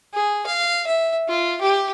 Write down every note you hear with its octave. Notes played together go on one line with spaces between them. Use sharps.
G#4
F5
E5
F4
G4